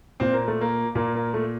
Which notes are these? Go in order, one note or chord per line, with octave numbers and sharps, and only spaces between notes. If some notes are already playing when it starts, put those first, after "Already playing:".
A#2 C4
A#3
A3
A#3
A#2 A#3
A#3
A3